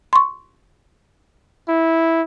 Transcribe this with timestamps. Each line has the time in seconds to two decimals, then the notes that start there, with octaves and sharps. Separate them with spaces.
0.13 C6 C#6
1.69 E4